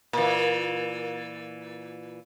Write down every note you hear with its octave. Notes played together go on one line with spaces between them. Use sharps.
A#2 E3